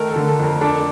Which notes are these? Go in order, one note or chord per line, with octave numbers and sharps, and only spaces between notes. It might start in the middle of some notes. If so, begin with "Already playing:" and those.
Already playing: D#3 A3 A#4
D3 A4
A4
F2
A#4
D4 A4